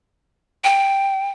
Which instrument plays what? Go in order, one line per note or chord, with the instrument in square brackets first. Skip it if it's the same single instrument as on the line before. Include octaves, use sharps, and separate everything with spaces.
[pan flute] G5